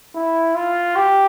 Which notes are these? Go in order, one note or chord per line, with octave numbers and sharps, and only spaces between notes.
E4
F4
G4